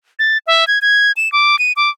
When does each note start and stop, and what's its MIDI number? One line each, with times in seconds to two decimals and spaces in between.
0.19 0.38 93
0.47 0.67 76
0.67 0.79 92
0.82 1.12 92
1.17 1.31 100
1.32 1.59 86
1.59 1.72 99
1.76 1.90 86